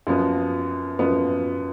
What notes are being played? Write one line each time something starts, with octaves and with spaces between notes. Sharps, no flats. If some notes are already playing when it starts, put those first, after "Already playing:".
F#2 F3 B3
F#2 F3 B3